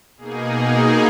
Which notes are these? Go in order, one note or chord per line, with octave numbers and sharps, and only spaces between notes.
B2 A#3 D#4 G#4